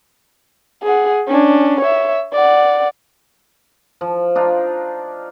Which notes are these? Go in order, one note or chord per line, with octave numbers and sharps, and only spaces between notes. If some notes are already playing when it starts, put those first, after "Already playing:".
G#4 F#5
C#4 D4
C#5 E5
D5 F#5
F3
D4 D#4 F4